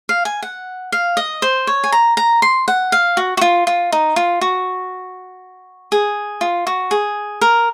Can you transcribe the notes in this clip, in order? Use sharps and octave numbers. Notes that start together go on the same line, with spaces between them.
F5
G#5
F#5
F5
D#5
C5
C#5
G#5
A#5
A#5
C6
F#5
F5
F#4
F#4
F4
F4
D#4
F4
F#4
G#4
F4
F#4
G#4
A#4